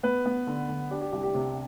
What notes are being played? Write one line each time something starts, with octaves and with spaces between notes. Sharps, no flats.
B3 B4
B3
D3
D3
D4 G4
G4
C2 G4
G4
C3 G4